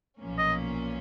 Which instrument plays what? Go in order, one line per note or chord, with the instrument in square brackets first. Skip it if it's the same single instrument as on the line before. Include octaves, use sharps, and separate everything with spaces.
[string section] B1 A#2 F3 A#3 C#4
[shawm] D#5